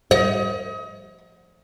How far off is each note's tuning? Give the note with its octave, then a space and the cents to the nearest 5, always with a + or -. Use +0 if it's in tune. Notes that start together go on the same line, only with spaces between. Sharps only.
D#5 +30